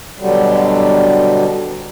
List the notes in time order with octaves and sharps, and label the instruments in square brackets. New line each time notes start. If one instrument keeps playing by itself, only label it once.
[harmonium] B2 D3 F#3 G3